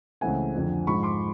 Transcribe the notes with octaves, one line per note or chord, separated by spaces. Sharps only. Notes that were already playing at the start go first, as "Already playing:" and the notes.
C#2 C#3 E3 A3 C4 F#5 G#5
F2 D3 F3
G#2 F3 G#3 B5 C#6
C6 D6